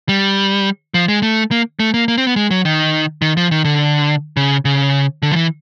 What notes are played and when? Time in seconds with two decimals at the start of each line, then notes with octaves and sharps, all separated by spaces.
0.09 G3
0.94 F3
1.08 G#3
1.23 A3
1.51 A#3
1.80 A3
1.94 A#3
2.08 A#3
2.18 C4
2.27 B3
2.36 G#3
2.51 F#3
2.65 D#3
3.22 D#3
3.37 F3
3.51 D#3
3.65 D3
4.37 C#3
4.65 C#3
5.22 D3
5.32 F3
5.36 E3